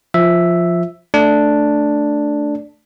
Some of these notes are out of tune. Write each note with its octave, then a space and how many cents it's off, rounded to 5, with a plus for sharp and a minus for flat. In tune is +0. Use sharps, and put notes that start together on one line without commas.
F3 +0 E5 +0
A3 +0 D4 +0